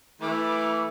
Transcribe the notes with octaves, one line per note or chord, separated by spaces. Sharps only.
E3 A3 B5 D6 F6